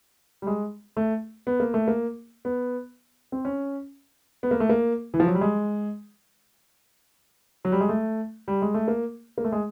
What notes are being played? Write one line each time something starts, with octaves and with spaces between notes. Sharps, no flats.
G3
G#3
A3
B3
A#3
A3
A#3
B3
C4
C#4
B3
A#3
A3
A#3
E3
F3
F#3
G3
G#3
F#3
G3
G#3
A3
G3
G#3
A3
A#3
A#3
A3
G#3